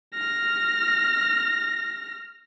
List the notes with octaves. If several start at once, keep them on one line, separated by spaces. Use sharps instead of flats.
F6 A#6